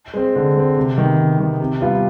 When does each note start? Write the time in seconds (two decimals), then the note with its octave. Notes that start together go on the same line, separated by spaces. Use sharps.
0.14 G#3 C4
0.36 D3
0.55 G#3 C4
0.77 C3
0.98 D#3 B3
1.19 C3
1.39 D#3 B3
1.60 C3
1.81 G3 B3 F4